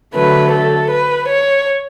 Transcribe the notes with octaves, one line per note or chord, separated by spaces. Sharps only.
D3 F#3 A3 B4
A4
B4
C#5